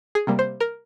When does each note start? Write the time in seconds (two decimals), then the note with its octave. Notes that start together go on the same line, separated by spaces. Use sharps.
0.15 G#4
0.27 C3 G3 A#3
0.39 C5
0.60 A#4